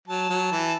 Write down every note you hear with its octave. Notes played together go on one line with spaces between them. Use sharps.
F#3 A5
F#3
E3